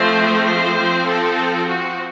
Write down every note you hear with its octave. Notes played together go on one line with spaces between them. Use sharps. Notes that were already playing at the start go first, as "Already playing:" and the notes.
Already playing: F3 A3 C4 C5
C5
F3 C4
A4
F#4